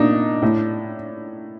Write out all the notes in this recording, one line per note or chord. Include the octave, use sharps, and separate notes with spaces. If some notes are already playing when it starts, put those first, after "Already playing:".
Already playing: A#2 D4 D#4
A2